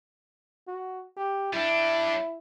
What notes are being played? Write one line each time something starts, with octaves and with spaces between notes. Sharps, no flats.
F#4
G4
G3 D4 E4